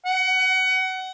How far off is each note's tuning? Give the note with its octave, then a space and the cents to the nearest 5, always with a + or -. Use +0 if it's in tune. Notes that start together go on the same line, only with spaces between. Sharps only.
F#5 +25